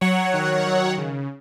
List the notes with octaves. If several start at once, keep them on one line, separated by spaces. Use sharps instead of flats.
F#3 C#5 F#5
D#3
F#3
C#3